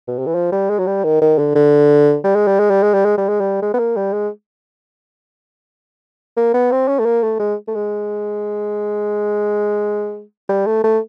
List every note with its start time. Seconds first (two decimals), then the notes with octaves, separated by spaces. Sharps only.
0.08 B2
0.19 C3
0.27 E3
0.35 F3
0.52 G3
0.70 G#3
0.79 F#3
0.87 G3
1.04 D#3
1.22 D#3
1.39 D3
1.55 D3
2.24 G3
2.36 G#3
2.48 G3
2.60 G#3
2.71 G3
2.83 G#3
2.94 G3
3.05 G#3
3.18 G3
3.29 G#3
3.41 G3
3.63 G#3
3.74 B3
3.79 A#3
3.97 G3
4.13 G#3
6.37 A#3
6.54 B3
6.72 C4
6.88 C#4
7.00 A3
7.06 A#3
7.24 A3
7.40 G#3
7.68 A3
7.75 G#3
10.49 G3
10.67 A3
10.84 A3